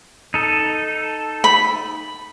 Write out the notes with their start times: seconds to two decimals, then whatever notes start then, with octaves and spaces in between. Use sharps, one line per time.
0.34 D#4 A4
1.44 B5